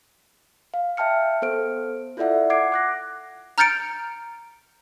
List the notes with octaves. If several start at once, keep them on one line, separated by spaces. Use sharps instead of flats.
F5
E5 G5 A5 F6 C#7
B3 A4 C5 F6 D7
E4 F4 A4 D5 E5 F#5
F#5 D6 G#6 C7 D7
D6 F#6 A#6
A#5 F6 G6 A6 C#7 D7